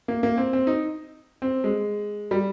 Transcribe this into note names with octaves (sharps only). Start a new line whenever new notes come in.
A#3
A#3
C4
C4
D#4
C4
G#3
G3